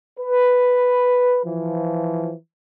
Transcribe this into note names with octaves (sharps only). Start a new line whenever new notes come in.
B4
E3 F3